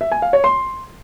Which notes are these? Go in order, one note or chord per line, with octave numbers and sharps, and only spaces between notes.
E5
G#5
F5
C#5
C6